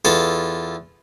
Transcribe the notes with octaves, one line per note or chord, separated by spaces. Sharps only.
E2 F4 A4